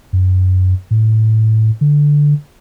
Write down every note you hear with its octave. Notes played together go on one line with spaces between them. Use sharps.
F#2
A2
D3